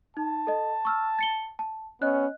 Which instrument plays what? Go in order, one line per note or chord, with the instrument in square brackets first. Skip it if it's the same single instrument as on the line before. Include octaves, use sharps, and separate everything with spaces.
[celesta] D#4 [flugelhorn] A5
[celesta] A4 D#5
C#6 E6 F6
A6 C#7 G7
A5
[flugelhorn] B3 [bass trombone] C#4 [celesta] D#5 F#6